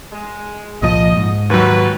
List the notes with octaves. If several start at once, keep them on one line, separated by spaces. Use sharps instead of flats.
G#3
C2 A#2 F3 D#5
G#2
D#2 F#3 F#4 B4